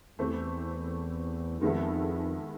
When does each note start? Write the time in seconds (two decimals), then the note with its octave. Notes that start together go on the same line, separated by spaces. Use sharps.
0.19 E2 E3 A3 C4
1.61 F2 D#3 G#3 B3 E4 A4